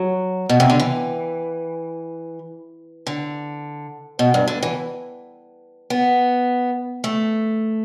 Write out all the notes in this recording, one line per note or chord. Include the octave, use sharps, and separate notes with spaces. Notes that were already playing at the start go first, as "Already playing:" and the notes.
Already playing: F#3
B2
C3
D3
E3
D3
B2
G2
D3
E3
B3
A3